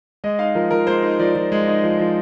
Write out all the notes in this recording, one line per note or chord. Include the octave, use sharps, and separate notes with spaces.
G#3 D#5
D#4 F5
F3 A#4
F3 A#4
G#3 C5
D#4
F3 D5
F3
G#3
D#4
F3
F3